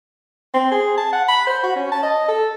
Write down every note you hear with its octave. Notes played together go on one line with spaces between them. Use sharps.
C4
G#4
A5
F#5
B5
C5
F#4
C#4
A5
D#5
A4